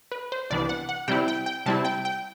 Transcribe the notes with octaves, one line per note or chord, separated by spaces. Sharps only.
B4
C5
C2 C3 E3 B3 D4 D5
F#5
F#5
C3 G3 C4 E4 G5
G5
G5
C3 G3 C4 E4 A5
G5
G5